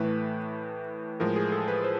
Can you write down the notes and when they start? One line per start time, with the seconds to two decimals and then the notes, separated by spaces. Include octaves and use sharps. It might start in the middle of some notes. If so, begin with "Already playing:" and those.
Already playing: A2 E3 A3 B4
1.20 A2 F3 G#3 A#4
1.36 G#4
1.52 A4
1.68 B4
1.84 C5